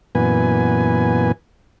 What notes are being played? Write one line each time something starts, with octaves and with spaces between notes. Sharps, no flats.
F#2 A#2 E3 B3 B4 G#5